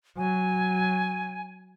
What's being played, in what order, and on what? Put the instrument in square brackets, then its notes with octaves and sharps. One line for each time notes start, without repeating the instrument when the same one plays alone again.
[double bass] F#3 [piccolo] G#5